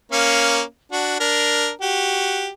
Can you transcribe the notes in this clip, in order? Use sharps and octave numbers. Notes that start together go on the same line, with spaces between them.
A#3 C#4 F5
D4 F#4
D4 A#4
F#4 G4